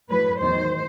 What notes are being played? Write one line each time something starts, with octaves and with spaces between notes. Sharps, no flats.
A2 F#3 B4
E2 D#3 F#3 C5